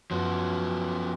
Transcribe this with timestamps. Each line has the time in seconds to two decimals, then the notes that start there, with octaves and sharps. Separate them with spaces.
0.11 F#2 F3 B3 F#4